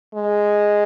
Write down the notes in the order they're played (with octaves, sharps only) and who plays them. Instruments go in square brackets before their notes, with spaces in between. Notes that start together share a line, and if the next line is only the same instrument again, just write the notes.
[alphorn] G#3